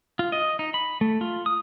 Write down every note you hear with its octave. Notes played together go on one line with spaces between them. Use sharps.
F4
D#5
D#4
B5
A3
F4
D#6